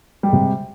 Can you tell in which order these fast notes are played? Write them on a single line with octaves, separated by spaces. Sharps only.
G3 G#3 C3